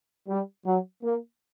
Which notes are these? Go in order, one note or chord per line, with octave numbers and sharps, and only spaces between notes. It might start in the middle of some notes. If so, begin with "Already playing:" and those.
G3
F#3
A#3